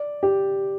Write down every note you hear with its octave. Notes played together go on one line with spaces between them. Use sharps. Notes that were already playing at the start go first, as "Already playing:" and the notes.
Already playing: D5
G4